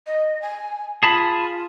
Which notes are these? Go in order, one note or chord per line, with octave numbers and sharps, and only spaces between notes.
D#5
G#5
F4 G#4 A5 B5